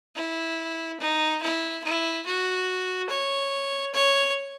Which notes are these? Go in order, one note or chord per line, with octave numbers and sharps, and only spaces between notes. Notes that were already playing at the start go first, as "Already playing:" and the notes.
E4
D#4
E4
E4
F#4
C#5
C#5